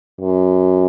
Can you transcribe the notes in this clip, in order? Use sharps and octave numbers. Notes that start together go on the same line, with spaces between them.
F#2